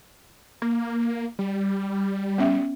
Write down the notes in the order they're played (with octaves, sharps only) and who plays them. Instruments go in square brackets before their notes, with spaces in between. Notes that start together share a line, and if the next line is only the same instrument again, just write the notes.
[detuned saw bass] A#3
G3
[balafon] B3 C#4 E5